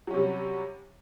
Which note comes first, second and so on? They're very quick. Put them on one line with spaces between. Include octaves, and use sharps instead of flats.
F#3 C#4 C3 G3